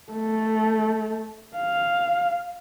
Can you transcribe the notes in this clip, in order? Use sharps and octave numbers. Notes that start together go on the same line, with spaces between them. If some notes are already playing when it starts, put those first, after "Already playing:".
A3
F5